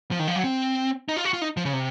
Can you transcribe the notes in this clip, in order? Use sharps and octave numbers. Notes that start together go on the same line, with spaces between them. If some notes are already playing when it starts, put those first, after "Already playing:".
F3
D#3
F3
F#3
C4
D#4
F4
F#4
F4
D#4
F3
C#3
C3